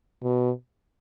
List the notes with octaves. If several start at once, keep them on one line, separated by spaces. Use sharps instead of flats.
B2